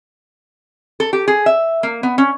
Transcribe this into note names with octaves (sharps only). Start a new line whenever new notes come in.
A4
G4
G#4
E5
A#3
B3
C#4